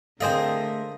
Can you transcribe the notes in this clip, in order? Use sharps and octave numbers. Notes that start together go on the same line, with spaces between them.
D3 A3 C4 G#4 A#4 C5 D#5 F5